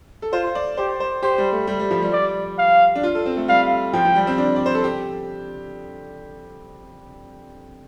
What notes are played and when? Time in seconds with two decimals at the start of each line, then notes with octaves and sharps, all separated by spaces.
0.22 A4
0.33 F4 C5
0.55 D5
0.77 G4 C5
1.00 C5
1.23 G4 C5
1.38 G3
1.52 A3
1.67 G3
1.79 G3
1.91 F3
2.02 G3
2.13 D5
2.58 F5
2.96 D4
3.04 F4
3.15 A4
3.26 C4
3.37 A3
3.48 G3 F5
3.93 F3 G5
4.05 F3
4.15 G3
4.27 C4
4.38 D4
4.56 D5
4.66 C5
4.75 A4
4.84 G4